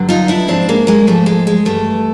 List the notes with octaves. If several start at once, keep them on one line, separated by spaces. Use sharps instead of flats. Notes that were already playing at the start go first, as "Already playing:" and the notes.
Already playing: G2 D3 F#3
D#4 F4
D4 E4
G#2 F3 C4 D4
G#3 A#3
G#3 A#3
G#2 F3 A3
G#3
G#3
G2 E3 A3